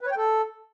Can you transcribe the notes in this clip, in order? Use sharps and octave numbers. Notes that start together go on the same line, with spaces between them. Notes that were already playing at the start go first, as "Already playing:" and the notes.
B4
C#5
G5
A4